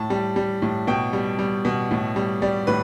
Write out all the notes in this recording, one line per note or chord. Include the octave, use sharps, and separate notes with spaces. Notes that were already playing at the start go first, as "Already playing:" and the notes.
Already playing: A2 A5
G3
G3
A2
B2 G5
G3
G3
B2
A2
G3
G3 D5
A2 B4